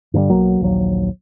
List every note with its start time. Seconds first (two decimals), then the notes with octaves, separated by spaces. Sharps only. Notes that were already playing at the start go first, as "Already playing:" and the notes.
0.14 G2 D3 F#3 G3
0.30 B1 F#3 A#3
0.61 A#1 D#2 F#3